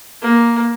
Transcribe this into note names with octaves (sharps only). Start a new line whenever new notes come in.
A#3